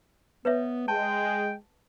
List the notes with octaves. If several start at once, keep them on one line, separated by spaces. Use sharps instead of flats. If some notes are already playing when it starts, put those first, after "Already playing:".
B3 B4 C#5 E5
G#3 G5 A5